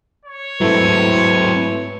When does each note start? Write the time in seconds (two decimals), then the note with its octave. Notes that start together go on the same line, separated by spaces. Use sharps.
0.25 C#5
0.61 G#2 F#3 A3 C4 E4 B4